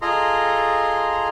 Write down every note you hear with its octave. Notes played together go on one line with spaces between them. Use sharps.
F4 G#4 A4 D#5 A#5 C6